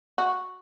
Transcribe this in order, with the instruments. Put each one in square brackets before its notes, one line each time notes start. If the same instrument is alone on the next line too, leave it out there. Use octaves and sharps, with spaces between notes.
[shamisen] F#4